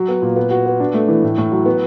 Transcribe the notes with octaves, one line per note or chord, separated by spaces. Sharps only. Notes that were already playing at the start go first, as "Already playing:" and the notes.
Already playing: F#3
B3
A#2
B3
F#4
B3
D4
A3
E3
A2
A2
F#3
B3